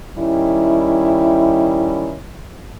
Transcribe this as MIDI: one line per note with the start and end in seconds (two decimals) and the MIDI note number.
0.17 2.17 51
0.17 2.17 55
0.17 2.17 61
0.17 2.17 64